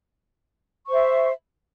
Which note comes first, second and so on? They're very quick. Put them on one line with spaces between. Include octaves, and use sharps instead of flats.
C#6 C5 E5